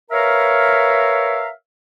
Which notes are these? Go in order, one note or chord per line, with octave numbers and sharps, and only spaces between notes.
A#4 B4 C#5 E5 F5 A#5